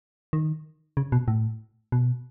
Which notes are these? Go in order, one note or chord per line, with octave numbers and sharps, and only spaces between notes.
D#3
C#3
B2
A2
B2